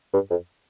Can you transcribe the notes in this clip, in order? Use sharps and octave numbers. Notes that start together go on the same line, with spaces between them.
G2
F2